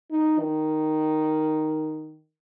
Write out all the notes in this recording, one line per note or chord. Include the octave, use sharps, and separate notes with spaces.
D#4
D#3